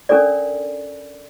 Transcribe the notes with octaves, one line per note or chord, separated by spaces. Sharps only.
C#4 D4 A4 A#4 D5